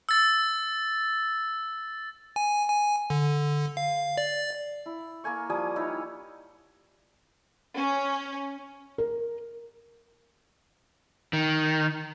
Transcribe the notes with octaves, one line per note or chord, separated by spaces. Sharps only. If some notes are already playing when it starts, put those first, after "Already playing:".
E6 A6
G#5
G#5
D3
F5
D5
E4
A#3 A#4 G#5 C#6
F3 G3 G#5 D#6
D#4 E4 C#5
C#4
A#4
D#3